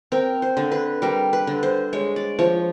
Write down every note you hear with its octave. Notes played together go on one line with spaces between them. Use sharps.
C4 A#4
C5
D3
B4
G3 A#4
B4
D3
C5
G#3 C#5
D5
F3 C#5